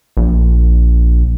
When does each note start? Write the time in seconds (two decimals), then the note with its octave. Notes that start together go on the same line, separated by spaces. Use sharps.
0.17 A#1